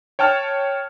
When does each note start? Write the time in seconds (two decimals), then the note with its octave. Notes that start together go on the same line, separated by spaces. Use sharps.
0.19 C#5 G5 A5 F6